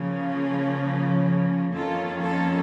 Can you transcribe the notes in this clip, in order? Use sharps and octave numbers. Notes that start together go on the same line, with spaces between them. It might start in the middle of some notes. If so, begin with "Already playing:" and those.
Already playing: C#3 F3 A#3 C#4
F4
F2 D#3 A#3 C#4 F4 A4
F4 A4